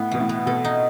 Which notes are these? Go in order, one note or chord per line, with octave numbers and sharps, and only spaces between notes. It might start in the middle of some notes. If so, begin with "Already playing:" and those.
Already playing: A2 B3
B2 E3
A2
B3
B2 A4
D#4